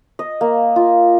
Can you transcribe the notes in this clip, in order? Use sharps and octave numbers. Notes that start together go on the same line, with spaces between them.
D#5
A#3
F4